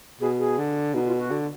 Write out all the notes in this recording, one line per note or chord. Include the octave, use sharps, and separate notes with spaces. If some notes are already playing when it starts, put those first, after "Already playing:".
B2 G#4
G#4
D3
B2 D#4
F4
F#4
D3